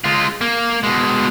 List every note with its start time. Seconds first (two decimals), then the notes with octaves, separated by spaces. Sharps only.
0.04 G#3 F4
0.41 A#3
0.83 B2 G#3